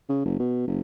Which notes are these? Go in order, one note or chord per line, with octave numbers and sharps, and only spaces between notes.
C#3
F#1
B2
F#1